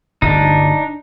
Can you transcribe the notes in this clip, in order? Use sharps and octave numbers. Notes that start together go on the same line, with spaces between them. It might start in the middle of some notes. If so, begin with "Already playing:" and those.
D1 G1 D4 D#4